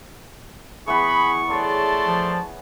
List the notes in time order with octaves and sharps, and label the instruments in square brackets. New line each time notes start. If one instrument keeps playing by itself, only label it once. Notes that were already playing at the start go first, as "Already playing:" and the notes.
[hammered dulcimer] E3 B3 [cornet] G#4 [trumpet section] B5 [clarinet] C#6
[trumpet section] A3 D5 C6 [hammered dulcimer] G#4 C#5 [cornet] A5
[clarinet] F3